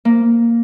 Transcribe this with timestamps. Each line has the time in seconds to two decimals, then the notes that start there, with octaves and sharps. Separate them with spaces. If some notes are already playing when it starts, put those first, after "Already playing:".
0.05 A#3